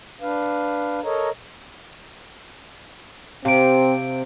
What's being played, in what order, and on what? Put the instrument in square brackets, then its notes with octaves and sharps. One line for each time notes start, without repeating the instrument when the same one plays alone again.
[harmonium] D4 B4 F5
A4 A#4 C#5 D#5 A#5
[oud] C3 [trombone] C4 [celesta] F5 D7